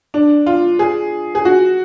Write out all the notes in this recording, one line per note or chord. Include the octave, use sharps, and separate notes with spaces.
D4
F4
G#4
G#4
F#4